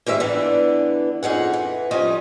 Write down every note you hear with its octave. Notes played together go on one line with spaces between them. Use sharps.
G#2 D#3 G3 E5 F5
D3 E3 B3 D4
F2 D#4 G#4 F#5
E3
F2 F3 G3 C#4 F4 D#5